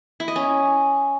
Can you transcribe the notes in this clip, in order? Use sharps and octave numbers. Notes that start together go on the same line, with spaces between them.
E4
D#5
C#4